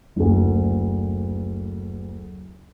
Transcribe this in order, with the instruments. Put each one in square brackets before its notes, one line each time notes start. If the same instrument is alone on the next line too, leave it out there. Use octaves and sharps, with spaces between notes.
[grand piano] F#1 D2